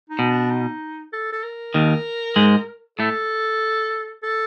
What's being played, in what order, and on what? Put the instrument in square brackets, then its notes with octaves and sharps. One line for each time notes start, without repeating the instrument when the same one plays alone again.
[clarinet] D#4
[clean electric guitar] B2
[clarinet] D4
D#4
A4
A4
A#4
[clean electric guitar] D#2 D#3
G#2 G#3
[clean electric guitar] A2 A3 [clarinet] A4
[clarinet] A4